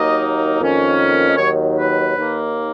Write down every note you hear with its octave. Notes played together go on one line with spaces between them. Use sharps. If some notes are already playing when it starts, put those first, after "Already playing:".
Already playing: D#2 D#3 F#3 A#3 D#4 D#5
F2 D#3 A#3 C#4
D#5
D#2 D#3 F#3 C#5
B4
D#2 D#3 A#3